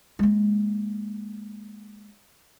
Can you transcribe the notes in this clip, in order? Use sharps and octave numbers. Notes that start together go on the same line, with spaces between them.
G#3 A#3